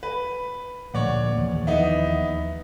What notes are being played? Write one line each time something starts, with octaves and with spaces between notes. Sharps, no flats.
B4
D2 A#2 F3 C#5 D5 F#5
D#2 E3 F3
B3 D#4 E4